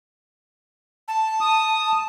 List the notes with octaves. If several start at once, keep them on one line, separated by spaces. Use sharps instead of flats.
A5
D#6